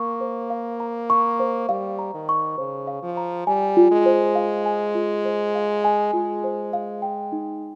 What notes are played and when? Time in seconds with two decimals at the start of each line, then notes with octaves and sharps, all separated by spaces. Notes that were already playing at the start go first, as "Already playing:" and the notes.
Already playing: A#3 C#6
0.21 C5
0.50 F5
0.80 A#5
1.10 C#6
1.40 C5
1.69 G3 F5
1.99 A#5
2.14 D#3
2.29 C#6
2.58 C#3 C5
2.87 F5
3.03 F3
3.17 A#5
3.47 G3 G#5
3.77 F4
3.91 G#3
4.06 C5
4.35 F5
4.66 G#5
4.95 F4
5.25 C5
5.55 F5
5.84 G#5
6.13 G#3 F4
6.44 C5
6.73 F5
7.02 G5
7.32 D#4